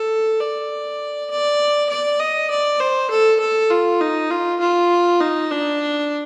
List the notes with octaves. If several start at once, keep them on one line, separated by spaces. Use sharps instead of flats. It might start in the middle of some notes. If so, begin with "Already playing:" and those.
Already playing: A4
D5
D5
D5
D#5
D5
C5
A4
A4
F4
D#4
F4
F4
D#4
D4